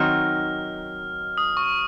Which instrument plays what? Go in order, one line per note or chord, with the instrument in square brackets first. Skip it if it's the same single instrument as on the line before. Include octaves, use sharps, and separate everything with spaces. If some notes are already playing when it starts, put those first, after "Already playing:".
Already playing: [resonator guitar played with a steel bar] D#3 F#3 C4 D#4 [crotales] F6
[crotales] D#6
C#6